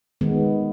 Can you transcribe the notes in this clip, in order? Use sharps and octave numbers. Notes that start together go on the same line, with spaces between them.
D#3 G#3 B3